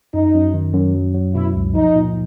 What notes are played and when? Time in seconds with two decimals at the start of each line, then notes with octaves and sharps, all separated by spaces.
0.14 F#2 D#4
0.34 F#2
0.54 D#3
0.74 F#2
0.95 F#3
1.14 F#3
1.35 B2 E4
1.55 C#2
1.75 F3 D#4
1.95 A#2